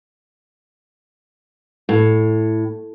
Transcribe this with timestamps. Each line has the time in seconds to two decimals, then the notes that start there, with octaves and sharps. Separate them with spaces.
1.89 A2